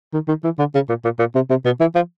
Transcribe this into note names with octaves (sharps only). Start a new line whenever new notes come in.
D#3
D#3
E3
D3
C#3
A#2
A#2
A#2
C3
C3
B2
E3
F3